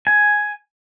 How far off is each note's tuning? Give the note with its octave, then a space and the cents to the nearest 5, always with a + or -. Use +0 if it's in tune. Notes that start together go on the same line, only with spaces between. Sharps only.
G#5 +5